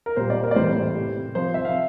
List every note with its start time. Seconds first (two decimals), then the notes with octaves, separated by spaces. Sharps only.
0.06 A#4
0.16 A#2 G3 C5
0.30 D5
0.43 A#4
0.51 D5
0.56 A2 E3 G3 C5
0.95 C3 G3
1.35 C3 F3 C5
1.54 E5
1.65 F5